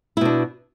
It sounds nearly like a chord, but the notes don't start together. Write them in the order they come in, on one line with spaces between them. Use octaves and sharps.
E4 B2 D4